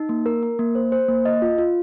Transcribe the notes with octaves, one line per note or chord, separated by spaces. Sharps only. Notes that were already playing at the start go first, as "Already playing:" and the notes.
Already playing: D#4
A#3
A#4
A#4
A#3
C5
C5
A#3
D#5
F4
F4